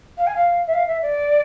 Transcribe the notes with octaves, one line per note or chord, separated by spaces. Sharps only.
F5
G#5
F5
E5
F5
E5
D5